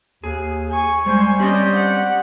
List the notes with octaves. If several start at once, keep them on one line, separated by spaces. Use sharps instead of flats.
D#2 G#4
G#5 C#6
G3 G#3 C5
C4 C#4 G4 D5 D#5
F#5